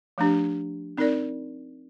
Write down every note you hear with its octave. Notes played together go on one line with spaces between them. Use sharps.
F3 A3 D4 G4
C4 D#4 A#4 D5